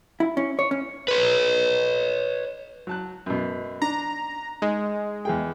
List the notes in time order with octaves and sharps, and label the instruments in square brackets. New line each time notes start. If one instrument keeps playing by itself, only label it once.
[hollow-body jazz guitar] E4
C#4
C#5
C#4
[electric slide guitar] B4 C#5
[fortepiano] F#3 A5 F#6
F#2 B2
[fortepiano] D4 [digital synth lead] A#5
[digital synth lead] G#3 [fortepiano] D#4
[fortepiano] E2 G#4 G5